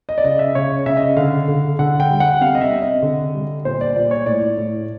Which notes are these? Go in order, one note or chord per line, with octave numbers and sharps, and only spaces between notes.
D#5
D5
C#3 D#5
E5
C#3 C#5
C#3 E5
D#5
D3 F5
D3
D3 F#5
G5
G3
F#5
C3 F5
D#5
E5
C3
D#5
D3
G3
A#2 C5
D5
A#2 D5
C#5
A2 D5
A2